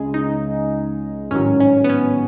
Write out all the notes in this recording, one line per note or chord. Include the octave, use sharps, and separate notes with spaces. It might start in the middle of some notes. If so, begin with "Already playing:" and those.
Already playing: C#2 C#3 G#3 G#4
D#4
A1 G#2 D#3 F#3 C#4
C#4
B3
C#4